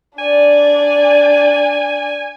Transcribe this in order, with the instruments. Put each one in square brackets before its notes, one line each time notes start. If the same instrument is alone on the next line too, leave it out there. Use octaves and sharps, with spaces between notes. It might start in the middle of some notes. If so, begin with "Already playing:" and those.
[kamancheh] D4 D5 [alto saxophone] G#5